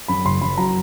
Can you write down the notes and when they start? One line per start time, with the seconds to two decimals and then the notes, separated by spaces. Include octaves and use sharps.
0.08 F#2 B5
0.25 F#1 C6
0.41 F#2 B5
0.58 F#3 A#5